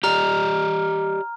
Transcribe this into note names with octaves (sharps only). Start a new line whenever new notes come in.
G4 D5 D#5 A#5 F6